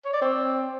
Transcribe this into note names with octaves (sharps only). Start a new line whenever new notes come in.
C#5
D5
C4